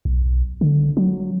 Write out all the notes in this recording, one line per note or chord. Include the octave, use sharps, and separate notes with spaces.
B1
D3
F#3